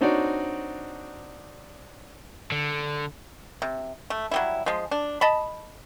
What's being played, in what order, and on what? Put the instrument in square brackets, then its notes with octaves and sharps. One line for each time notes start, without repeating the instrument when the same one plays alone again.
[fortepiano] C4 D4 D#4 F#4 C#5 D5
[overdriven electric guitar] D3
[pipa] C3
A3
F#3 G3 E4
F3 G#3
D4
D#5 A5 B5